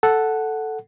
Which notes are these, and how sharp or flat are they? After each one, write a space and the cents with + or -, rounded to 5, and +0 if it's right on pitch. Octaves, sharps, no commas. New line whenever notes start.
A4 +0 F#5 +0